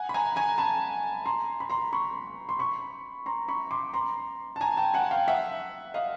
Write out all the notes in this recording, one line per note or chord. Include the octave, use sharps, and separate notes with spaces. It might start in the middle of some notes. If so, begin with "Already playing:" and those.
Already playing: F#5 G#5
B5
G#5 A#5
G#5 A#5
A5 B5
A#5 C6
B5
A#5 C6
B5 C#6
C6
B5 C#6
A#5 C6
B5 C#6
C6 D6
A#5 C6
A5
G#5 A#5
G5 A5
F#5 G#5
F5 G5
E5 F#5
D#5 F5